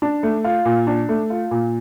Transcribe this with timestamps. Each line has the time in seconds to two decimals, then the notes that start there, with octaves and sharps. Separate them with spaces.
0.02 D4
0.23 A3
0.44 F4
0.65 A#2
0.87 D4
1.09 A3
1.30 F4
1.51 A#2